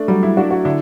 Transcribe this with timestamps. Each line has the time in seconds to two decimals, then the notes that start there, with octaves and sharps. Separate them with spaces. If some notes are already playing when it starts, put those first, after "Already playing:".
Already playing: A3 D4
0.08 F#3 G3
0.23 E4
0.37 D4 F#4
0.51 F#4
0.65 D3 E4